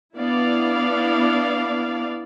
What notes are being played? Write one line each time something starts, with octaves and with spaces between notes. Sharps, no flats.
B3 D4 E4 D5 F5